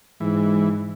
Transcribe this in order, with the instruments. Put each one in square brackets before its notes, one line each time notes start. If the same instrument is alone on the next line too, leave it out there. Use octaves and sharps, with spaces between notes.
[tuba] G#2 [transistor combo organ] E3